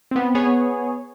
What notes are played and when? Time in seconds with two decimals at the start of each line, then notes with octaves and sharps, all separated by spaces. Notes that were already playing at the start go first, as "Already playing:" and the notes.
0.11 B3 C4
0.35 B3 G#4 C#5